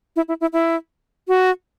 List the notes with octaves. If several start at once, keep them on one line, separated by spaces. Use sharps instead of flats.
E4
E4
E4
E4
F#4